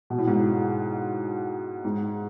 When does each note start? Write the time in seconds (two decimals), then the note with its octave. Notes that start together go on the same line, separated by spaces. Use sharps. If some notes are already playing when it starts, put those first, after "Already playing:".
0.10 B2
0.18 A2
0.27 G#2
0.36 A2
1.84 G#2